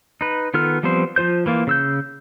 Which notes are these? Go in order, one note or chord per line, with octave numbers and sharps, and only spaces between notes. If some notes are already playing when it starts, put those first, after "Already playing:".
D#4 B4
D#3 B3 F4 A4 F6
F3 G3 B3 C4 C5
F3 F4 C5 G6
E3 A#3 F4
C#3 E6 G6